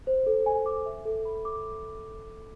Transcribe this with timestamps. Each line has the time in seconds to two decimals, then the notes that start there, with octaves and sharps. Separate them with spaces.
0.07 C5
0.27 A4
0.46 G#5
0.66 D6
0.86 E5
1.05 A4
1.25 B5
1.45 D6